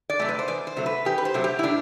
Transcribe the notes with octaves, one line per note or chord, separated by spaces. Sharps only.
D5
C3 F#3 A3
B4
C5
E2 D5
C5
C3 F#3 A3
B4
E2 G4
B4
C5
C3 F#3 A3
G4
E4
A2 D4